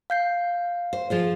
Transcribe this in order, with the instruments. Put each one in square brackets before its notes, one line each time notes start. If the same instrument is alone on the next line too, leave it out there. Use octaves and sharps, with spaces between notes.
[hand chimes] F5 G6 C7
[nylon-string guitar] C5
F3 G#4 C5